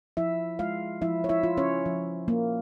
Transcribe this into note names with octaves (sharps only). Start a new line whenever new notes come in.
F3 E4 E5
G#3 F4 F5
F3 E4 E5
C#5
E4 E5
F4
C#4 C#5
F3
A#3